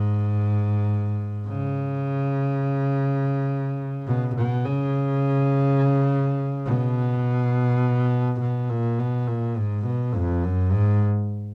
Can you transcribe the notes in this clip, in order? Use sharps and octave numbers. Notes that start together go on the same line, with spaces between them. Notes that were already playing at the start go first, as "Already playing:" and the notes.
Already playing: G#2
C#3
B2
B2
C#3
B2
B2
A#2
B2
A#2
G#2
B2
F2
F#2
G#2